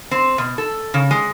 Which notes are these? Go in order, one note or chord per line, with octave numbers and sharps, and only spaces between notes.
C4
B2
A4
C#3
G#3